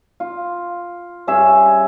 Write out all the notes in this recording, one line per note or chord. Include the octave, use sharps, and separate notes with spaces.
F4
G2 C#4 G#4 E5